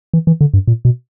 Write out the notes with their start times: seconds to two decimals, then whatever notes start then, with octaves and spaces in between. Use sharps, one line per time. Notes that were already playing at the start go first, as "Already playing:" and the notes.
0.13 E3
0.27 E3
0.41 D3
0.54 G2
0.67 A#2
0.85 B2